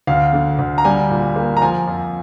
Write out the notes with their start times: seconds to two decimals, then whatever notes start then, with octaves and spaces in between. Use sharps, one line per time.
0.07 D2 F5
0.33 D3
0.59 D2
0.78 A#5
0.85 G3 G#5
1.10 A#2
1.36 A#3
1.57 A#5
1.62 F3 G#5
1.87 F2